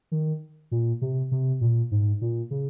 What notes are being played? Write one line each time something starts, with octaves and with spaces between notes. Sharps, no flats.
D#3
A#2
C3
C3
A#2
G#2
A#2
C#3